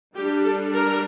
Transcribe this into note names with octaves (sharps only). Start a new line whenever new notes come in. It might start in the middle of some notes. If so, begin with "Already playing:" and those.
G3 D4 G4
A4
A#4